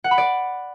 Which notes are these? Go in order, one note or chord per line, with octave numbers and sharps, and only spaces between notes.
F#5
B5
D5